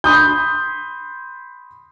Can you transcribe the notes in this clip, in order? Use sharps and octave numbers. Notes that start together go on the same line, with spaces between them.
B5 C6 D#6 G6